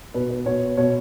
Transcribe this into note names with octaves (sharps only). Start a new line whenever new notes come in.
B2 B4
B4
B2 C#5
B2 C#5